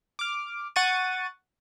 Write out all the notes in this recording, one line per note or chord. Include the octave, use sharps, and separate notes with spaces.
D6 F6
F#5 C#6 A6 D#7